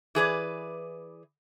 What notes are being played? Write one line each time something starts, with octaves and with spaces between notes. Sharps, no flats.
E3 G#4 B4 D5